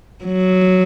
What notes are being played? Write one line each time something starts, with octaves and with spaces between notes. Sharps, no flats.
F#3